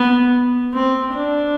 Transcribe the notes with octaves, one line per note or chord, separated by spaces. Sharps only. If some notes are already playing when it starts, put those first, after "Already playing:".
Already playing: B3
C4
D4